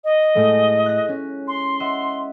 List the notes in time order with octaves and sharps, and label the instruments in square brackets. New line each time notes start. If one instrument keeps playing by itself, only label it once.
[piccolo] D#5
[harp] A2 G#3 A3
F#6 A#6
C#4
[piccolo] C6
[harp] D#5 E5 F#5